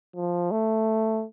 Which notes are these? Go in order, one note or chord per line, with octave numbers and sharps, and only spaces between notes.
F3
A3